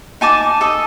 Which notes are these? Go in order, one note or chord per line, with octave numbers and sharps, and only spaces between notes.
D#4 G#5 A5 D6
A4 D#5 A5